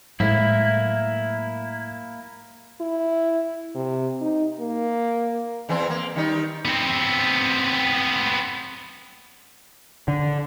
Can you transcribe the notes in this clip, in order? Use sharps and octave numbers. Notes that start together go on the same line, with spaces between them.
A2 F#3 G#3 A#3 E4
E4
C3
D#4
A#3
E2 E3 C4
A#3
D#3 G3 D#4
B3 C4
D3